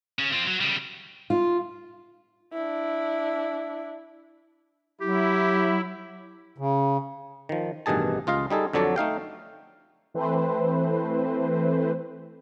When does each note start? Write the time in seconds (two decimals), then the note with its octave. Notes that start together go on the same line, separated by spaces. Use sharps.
0.19 C#3 C#4
0.33 C4 F4
0.47 F#3
0.61 C#3 G3
1.30 F4
2.53 D4 E4
5.01 F#3 E4 G4
6.58 C#3
7.49 D#3 F3
7.86 A1 G2 B2 D#3 G#4 A5
8.27 C#2 F4 D#5 F5
8.50 G3 D#4 G#4 A4
8.73 F2 D3 F#3 A4 C#5 D5
8.96 A3 D#4 F5 G5
10.14 E3 A3 C4 B4 C5